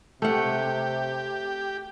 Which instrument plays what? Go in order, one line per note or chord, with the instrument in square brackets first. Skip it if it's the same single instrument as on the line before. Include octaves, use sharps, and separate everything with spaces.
[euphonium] C3 [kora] A3 F#5 [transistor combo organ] G4